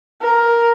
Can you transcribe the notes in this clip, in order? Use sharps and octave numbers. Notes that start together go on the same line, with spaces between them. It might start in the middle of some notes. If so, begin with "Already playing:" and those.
A#4